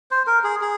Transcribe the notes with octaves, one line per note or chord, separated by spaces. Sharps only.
C5
A#4
G#4
G#4